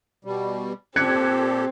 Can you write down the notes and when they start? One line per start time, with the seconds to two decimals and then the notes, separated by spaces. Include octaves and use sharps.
0.25 B2 G3
0.96 A#2 C4 G4 A4 F#6 G#6 C#7